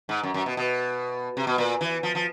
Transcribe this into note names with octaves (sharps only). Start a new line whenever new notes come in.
G#2
F#2
F#2
B2
B2
C3
B2
A#2
E3
F3
F3